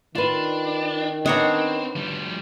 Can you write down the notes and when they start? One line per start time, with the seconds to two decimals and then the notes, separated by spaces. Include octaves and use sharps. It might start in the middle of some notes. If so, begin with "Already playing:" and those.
0.15 D#3 D4 F4 B4
1.26 B3 C4 D4 C#5 D#5 A#5
1.96 F3 G3